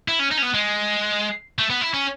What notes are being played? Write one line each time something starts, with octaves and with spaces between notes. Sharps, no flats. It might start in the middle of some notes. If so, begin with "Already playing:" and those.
E4
C#4
D#4
C#4
B3
G#3
A3
B3
E4
C#4